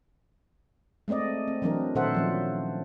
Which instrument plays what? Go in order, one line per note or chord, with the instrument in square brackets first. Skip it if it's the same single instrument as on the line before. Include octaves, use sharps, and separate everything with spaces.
[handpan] G#3 A3 C4 D5 D#5
C4
E3 F#3 C4 D4 A#4
A#2 D#3 A4 C5 E5 F#5
F3 F#3 C#4